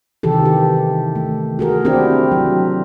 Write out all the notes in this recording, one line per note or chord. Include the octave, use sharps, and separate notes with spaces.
C3 D#3 E3 G4 A4
G4
A3
F#4 G#4 A#4
C4 D4 E4 F#4 G4
F#3